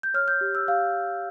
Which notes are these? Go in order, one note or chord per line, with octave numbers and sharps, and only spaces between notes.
G6
C#5 F6
G6
G4
E6
G4 F5